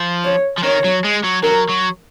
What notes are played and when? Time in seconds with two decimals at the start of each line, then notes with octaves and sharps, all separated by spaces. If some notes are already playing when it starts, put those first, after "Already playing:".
Already playing: F3
0.25 C#5
0.58 F3
0.64 D#3 C#5
0.84 F#3
1.04 G#3
1.24 F#3
1.43 F#3 A#4
1.70 F#3